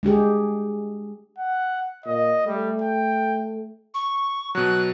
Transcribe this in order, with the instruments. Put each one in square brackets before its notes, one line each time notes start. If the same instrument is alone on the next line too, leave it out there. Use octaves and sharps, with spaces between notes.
[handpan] G#3 D4 G4 G#4
[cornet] F#5
[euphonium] A#2 [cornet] D#5
[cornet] G3 [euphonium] A3
[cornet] G5
[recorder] C#6
[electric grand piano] B2 F#3 [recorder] F#6